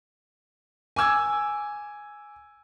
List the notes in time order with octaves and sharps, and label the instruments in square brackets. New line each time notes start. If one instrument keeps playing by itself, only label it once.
[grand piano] G#5 D6 E6 G#6